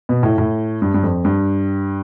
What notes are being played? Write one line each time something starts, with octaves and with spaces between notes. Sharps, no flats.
B2
A2
A2
G2
G2
F2
G2